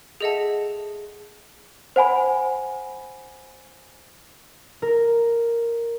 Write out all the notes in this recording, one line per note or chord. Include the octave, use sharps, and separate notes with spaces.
G#4 A4 D#5 E5 F#5 A5
C5 F#5 G#5 B5
A#4